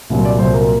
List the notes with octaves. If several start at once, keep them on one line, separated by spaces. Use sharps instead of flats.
C2 A#2 F#3
D5
C2 A#2 F#3 C5
A#4